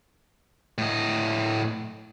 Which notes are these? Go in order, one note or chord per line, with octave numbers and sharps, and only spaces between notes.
A2 D#5